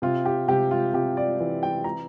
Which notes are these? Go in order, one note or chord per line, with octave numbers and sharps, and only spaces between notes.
C3 F4
G4
C3 G4
F4
C3 G4
D5
E3
G5
A#5